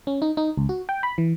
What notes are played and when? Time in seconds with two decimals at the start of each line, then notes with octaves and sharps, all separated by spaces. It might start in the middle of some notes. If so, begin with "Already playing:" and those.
0.07 C#4
0.22 D#4
0.37 D#4
0.57 C#2
0.69 F#4
0.89 G5
1.03 B5
1.18 E3